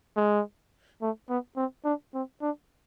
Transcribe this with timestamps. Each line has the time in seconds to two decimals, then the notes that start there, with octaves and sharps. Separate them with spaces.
0.17 G#3
1.02 A3
1.29 B3
1.57 C4
1.85 D4
2.14 C4
2.42 D4